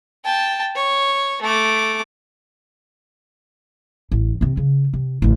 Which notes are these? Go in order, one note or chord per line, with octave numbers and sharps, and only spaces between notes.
G5 A5
C#5
A3 D6
A1
C3 C4
C#3
C3
A1 D2